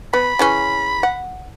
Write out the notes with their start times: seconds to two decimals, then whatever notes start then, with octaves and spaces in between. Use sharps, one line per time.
0.13 B3 B5
0.39 C#3 E3 C#4
1.03 F#5